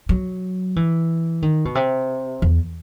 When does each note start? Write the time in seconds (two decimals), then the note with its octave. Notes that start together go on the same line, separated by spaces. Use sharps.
0.09 F#3
0.76 E3
1.42 D#3
1.65 B2
1.75 C3
2.42 E2